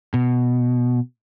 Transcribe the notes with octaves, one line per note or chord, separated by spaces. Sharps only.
B2